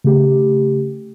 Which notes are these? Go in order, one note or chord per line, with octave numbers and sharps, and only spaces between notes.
C#3 A3 G4